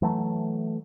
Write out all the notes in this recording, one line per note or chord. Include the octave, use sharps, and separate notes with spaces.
E3 F#3 A3